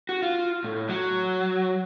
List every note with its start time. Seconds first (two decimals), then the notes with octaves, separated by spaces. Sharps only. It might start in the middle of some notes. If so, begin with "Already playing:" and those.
0.09 F#4
0.22 F4
0.64 A2
0.89 F#3